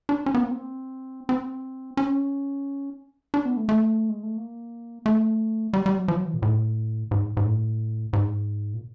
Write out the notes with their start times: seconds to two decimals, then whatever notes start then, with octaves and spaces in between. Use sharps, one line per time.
0.09 D4
0.26 C#4
0.34 B3
0.43 A#3
0.51 C4
1.29 C4
1.97 C#4
3.34 D4
3.46 B3
3.57 A3
3.69 A3
4.09 G#3
4.23 A3
4.37 A#3
5.06 A3
5.73 G3
5.86 G3
5.96 F#3
6.08 F3
6.16 F#3
6.25 E3
6.34 A#2
6.42 A2
7.11 G#2
7.37 G#2
7.45 A2
8.13 G#2
8.74 A#2